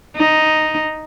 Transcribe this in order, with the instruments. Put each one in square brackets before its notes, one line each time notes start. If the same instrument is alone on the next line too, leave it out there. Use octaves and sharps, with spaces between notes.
[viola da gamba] D#4